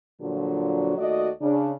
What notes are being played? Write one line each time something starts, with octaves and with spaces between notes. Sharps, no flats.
A#2 D3 F3 F#3 D4 F#4
D#2 A3 F#4 D5 D#5
C#3 D4